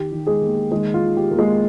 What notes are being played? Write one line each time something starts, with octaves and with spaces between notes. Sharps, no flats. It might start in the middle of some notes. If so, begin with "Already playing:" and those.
Already playing: D#3 G4
D#3
G#3 G#4
A#3
D#3 G#3 G#4
F4
D#3
G4
A#3
G#3 G#4